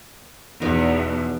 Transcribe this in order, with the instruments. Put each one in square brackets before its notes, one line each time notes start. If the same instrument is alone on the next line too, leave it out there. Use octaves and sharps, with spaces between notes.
[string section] E2 [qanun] B2 D#4 A#5